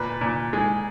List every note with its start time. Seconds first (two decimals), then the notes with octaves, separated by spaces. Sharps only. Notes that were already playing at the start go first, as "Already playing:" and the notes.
Already playing: A#2 B4
0.21 A#2
0.53 G#3